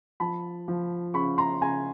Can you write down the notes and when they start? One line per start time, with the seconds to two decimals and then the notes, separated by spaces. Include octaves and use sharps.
0.20 F3 A5 B5
0.68 F3
1.14 C#3 B5 C#6
1.38 A#5 C6
1.61 C#3 G#5 A#5